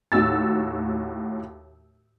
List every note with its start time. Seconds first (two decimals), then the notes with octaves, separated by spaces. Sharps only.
0.12 D#2 A2 F#4 E6 A6